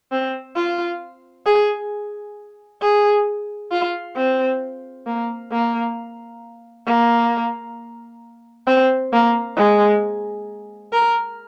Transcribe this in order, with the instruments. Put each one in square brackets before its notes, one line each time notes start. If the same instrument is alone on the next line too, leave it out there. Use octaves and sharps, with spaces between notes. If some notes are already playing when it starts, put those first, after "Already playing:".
[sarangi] C4
F4
G#4
G#4
F4
C4
A#3
A#3
A#3
C4
A#3
G#3
A#4